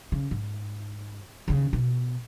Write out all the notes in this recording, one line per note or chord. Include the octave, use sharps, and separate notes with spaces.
C#3
G#2
D#2 C#3
B2